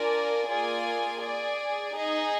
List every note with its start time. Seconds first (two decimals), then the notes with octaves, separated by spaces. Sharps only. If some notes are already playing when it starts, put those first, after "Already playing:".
Already playing: D4 F4 A#4 D5 G#5
0.48 A#3 F4 G#4 D5 G#5
1.20 G#4 D5 G#5
1.94 D#4 G#4 D#5